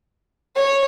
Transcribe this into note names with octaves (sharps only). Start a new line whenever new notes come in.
C#5